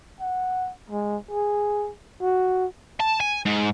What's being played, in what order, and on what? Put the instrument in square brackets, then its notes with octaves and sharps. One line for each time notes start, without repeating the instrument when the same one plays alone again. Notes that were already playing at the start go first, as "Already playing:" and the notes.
[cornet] F#5
G#3
G#4
F#4
[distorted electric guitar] A5
G#5
G#2